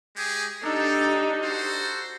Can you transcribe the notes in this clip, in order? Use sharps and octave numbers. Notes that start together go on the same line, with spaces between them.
G#3 G4 G#4
D4 D#4 G4 A4
F#4 A4 C5